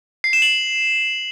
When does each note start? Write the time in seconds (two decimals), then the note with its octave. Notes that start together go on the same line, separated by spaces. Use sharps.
0.24 C7
0.33 E7
0.42 F#7